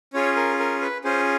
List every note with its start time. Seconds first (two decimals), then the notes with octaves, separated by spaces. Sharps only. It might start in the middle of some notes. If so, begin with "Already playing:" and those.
0.13 C#4 F4 G#4 C#5
0.36 A#4
0.59 A#4
0.82 B4
1.04 C#4 F4 G#4 C5